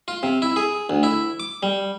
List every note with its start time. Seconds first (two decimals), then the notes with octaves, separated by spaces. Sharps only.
0.08 F4
0.23 C3
0.42 E4
0.56 G#4
0.90 D2
1.03 E4
1.40 D6
1.63 G3